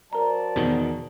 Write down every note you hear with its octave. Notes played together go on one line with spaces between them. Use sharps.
F#3 A#4 C5 D5 A5 A#5
E2 B2 D#3